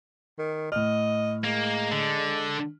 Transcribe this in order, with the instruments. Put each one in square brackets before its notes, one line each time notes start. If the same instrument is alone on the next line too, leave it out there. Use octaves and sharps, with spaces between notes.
[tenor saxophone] D#3
[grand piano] A2 F6 [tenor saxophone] D#5
[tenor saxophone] G#3 [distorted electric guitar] A#3
[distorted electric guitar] D3